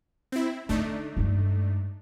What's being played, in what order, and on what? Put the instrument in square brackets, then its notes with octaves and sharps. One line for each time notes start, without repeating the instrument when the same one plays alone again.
[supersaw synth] C4 E4
[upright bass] D3 [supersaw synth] A3 D4 D#4
[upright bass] G2 G#3